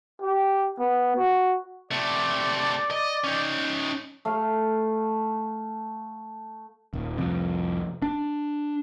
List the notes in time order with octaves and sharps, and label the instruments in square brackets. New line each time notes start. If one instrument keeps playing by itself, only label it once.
[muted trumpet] G4
B3
F#4
[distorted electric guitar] C3 A3 [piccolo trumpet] D5
[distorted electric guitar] D#5
C#4 D#4
[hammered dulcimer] A3 F5
[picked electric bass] D#1
C2 F2
D4